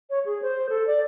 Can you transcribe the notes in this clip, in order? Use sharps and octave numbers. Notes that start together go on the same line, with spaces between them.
C#5
G#4
C5
A4
D5